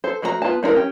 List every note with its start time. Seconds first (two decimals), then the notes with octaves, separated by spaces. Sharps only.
0.04 A4 C5
0.22 F3 A3 F#4 A4 A#5
0.42 B3 F4 G#5 A5
0.63 A3 D4 E4 A#4 F#5
0.75 C#4 G4